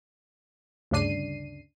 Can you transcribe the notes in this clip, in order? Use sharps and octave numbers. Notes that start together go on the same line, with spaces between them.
D2 G2 C#3 D4 C7 D#7